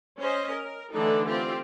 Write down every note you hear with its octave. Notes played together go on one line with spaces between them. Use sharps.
C#4 C5 D#5
A#4
D3 E3 A3 D4 D#4 A4
C4 F4 G4